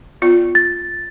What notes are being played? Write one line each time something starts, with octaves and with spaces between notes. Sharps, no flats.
B3 F4 D5
A6